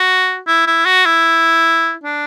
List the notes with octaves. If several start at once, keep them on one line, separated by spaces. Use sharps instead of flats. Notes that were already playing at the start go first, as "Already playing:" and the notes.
Already playing: F#4
E4
E4
F#4
E4
D4